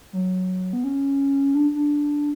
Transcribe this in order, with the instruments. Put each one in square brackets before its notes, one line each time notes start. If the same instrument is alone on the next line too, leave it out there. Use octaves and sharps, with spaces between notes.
[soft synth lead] F#3
B3
C#4
D4
D4